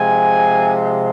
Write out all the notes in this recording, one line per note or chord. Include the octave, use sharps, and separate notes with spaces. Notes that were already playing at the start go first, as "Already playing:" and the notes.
Already playing: C3 F3 G#3 G#5